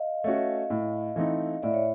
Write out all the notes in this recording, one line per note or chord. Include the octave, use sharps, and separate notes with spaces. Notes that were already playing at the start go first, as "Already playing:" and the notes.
Already playing: D#5 F5
A3 C#4 F#4
A2
E3 A3 C4 D#4
A2 D5 E5
C#5